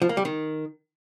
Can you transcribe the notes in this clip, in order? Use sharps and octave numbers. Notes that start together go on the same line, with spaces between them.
F3
A#3
G3
D#3